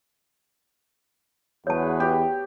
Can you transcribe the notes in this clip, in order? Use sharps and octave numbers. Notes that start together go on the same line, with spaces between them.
E2 F#4 G#4 B4 C#5 A5
G4